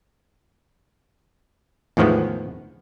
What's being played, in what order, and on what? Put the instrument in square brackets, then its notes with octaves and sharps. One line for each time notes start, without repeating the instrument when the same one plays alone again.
[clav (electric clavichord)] E2 A2 D#3 F3 G#3 B3